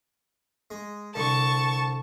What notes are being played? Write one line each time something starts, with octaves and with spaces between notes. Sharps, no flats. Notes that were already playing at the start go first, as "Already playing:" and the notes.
G#3
C2 D3 A5 C#6